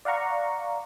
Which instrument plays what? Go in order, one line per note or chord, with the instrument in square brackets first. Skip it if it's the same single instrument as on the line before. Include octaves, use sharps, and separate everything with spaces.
[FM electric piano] D5 F5 F#5 A#5 C#6